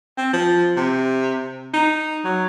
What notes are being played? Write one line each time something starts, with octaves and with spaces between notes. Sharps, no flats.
C4
F3
C3
D#4
F#3